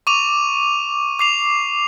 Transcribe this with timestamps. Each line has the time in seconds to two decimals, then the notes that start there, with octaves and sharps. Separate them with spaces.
0.07 C#6 D6 D#7 F7
1.19 D6 C7 F7